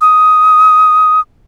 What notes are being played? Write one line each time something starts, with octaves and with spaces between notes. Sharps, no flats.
D#6